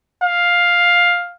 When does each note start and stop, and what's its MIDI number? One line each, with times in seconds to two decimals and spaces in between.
0.24 1.33 77